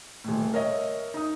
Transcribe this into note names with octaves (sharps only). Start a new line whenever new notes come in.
D#1 A2
A#4 C#5 D#5 E5
D#4 D#6